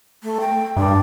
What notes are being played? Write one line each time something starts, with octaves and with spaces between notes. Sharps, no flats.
A3
G5
G2 D4